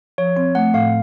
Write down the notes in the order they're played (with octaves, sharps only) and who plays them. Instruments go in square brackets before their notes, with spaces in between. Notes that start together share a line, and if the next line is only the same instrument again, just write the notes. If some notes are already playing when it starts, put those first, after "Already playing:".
[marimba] F3 [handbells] C#5
[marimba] C4
[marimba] A3 [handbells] F#5
[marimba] A2 [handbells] F5